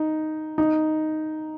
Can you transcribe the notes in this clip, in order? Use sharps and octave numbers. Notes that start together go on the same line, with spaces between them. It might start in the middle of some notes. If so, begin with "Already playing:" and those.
Already playing: D#4
D#4